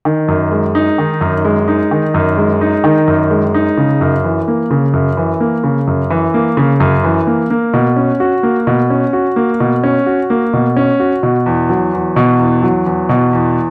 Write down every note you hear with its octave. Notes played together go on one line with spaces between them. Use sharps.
D#3
F#2
G#3
D#4
D#3
F#2
G#3
D#4
D#3
F#2
G#3
D#4
D#3
F#2
G#3
D#4
C#3
F#2
E3
A#3
C#3
F#2
E3
A#3
C#3
F#2
E3
A#3
C#3
F#2
E3
A#3
A#3
B2
C#4
F#4
A#3
B2
C#4
F#4
A#3
B2
C#4
F#4
A#3
B2
C#4
F#4
B2
E2
F#3
E2
B2
E2
F#3
E2
B2
E2